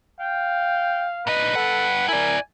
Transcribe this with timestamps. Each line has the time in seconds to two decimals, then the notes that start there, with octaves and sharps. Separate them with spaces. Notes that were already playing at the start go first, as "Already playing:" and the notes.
0.20 F5 G5
1.27 A#2 B4 D#5
1.55 G2 A4 F#5
2.08 E4 A#4 D5 G#5